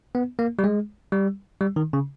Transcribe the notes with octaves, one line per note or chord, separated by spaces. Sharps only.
B3
A#3
G3
G#3
G3
G3
D#3
C#3